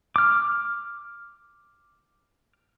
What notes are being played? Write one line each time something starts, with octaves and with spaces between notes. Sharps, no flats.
D6 F6